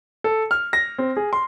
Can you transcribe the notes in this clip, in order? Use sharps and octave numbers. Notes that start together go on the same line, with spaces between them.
A4
F6
A#6
C4
G#4
C6